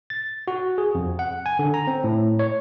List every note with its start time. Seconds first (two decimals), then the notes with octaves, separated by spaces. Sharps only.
0.10 A6
0.48 F#4
0.78 G#4
0.95 F2
1.19 F#5
1.46 G#5
1.59 D3
1.74 A#5
1.87 C4
2.04 A2
2.39 C#5